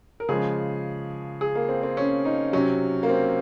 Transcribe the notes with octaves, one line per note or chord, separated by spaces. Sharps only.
A#4
C#3 F3 G#3 G#4
G#4
A#3
C4
C4
C#4
D#4
C3 F#3 C#4
A#3
C4